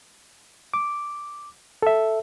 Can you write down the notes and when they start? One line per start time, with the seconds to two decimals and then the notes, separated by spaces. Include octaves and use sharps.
0.74 D6
1.82 A4 E5